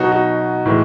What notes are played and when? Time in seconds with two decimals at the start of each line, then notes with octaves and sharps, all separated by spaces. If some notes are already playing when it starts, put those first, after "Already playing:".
Already playing: B2 F#3 D#4 F#4
0.12 D#4 F#4
0.66 A2 E3 G#3